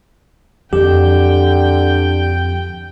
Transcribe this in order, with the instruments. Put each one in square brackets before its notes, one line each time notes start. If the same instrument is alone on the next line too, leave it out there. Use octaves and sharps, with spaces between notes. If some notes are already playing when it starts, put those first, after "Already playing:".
[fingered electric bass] F2 [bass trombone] D3 [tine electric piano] G4 [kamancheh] G5